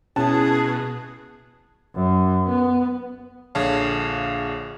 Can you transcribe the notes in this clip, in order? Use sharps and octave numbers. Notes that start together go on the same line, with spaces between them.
B2 C#4 E4 G#4 A5
F#2
B3
A#1 D3 G#4 C#5 F5 A5